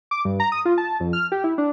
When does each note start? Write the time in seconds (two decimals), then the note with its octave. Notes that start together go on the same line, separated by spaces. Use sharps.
0.11 D6
0.25 G2
0.40 A#5
0.52 D#6
0.65 F4
0.78 A5
1.00 F2
1.13 F6
1.32 G4
1.44 E4
1.58 D4